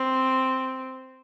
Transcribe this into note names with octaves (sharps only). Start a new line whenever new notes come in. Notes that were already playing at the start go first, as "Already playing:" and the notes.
Already playing: C4